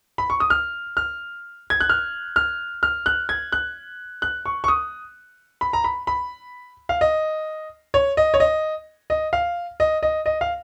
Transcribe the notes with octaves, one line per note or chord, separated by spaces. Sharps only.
B5
C#6
D#6
F6
F6
G#6
F#6
F6
F6
F6
F#6
G#6
F#6
F#6
C#6
C#6
D#6
B5
A#5
B5
B5
F5
D#5
C#5
D#5
C#5
D#5
D#5
F5
D#5
D#5
D#5
F5